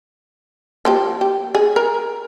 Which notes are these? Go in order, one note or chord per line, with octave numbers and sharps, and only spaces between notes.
F3 A#3 G4
G4
G#4
A#4